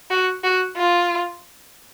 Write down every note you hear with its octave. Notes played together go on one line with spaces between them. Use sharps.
F#4
F#4
F4